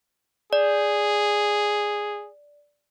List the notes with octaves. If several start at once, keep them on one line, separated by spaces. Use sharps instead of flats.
G#4 D5